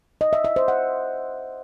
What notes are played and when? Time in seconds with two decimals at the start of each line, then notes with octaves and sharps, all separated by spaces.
0.21 D#5
0.33 E5
0.44 E5
0.56 C5
0.68 F#5